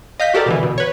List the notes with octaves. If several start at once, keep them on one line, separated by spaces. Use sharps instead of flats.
D#5 F5 G6 B6
F#4 G4 A4 A#4 D5
B2 D3 E3
B2
B4 C#5